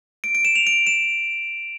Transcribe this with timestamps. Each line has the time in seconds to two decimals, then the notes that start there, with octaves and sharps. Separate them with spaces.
0.24 D7
0.35 D7
0.45 E7
0.55 F7
0.67 D7
0.87 E7